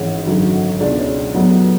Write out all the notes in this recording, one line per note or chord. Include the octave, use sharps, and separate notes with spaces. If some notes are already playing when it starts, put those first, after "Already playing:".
Already playing: G#1 G#2 E3 G#3 C#4
G#1 F#2 D3 F#3
C#2 B2 G#3 D4
C#4
B1 A2 F#3 B3